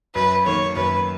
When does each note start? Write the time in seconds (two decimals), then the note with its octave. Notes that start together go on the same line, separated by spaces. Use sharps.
0.14 F#2 B4
0.45 D#3 A#3 C#5
0.76 F#2 B4